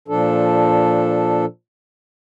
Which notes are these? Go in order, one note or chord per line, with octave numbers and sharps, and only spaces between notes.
A#2 F3 D4 A4